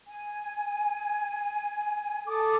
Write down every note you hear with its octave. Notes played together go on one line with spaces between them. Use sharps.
G#5
A4 D6 D#6